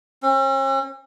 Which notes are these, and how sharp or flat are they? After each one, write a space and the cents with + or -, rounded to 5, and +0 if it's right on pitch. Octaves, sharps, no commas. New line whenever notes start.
C#4 -45